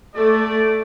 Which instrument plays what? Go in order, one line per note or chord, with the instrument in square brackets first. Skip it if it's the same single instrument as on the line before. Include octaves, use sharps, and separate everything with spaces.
[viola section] A3 [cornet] D5